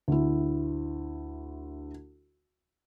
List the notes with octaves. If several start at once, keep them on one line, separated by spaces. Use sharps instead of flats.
D2 E4